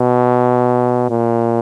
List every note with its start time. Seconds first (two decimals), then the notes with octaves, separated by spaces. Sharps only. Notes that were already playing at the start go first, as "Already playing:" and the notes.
Already playing: B2
1.10 A#2